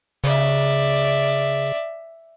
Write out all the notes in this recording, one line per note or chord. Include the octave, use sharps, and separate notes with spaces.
C#3 D5 E5